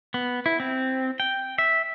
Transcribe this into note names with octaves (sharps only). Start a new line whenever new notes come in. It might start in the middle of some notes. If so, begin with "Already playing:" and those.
B3
E4
C4
G5
E5